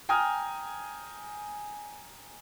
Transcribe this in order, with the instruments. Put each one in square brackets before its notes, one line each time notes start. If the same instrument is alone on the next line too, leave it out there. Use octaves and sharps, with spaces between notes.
[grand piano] G5 G#5 A#5 D#6 F6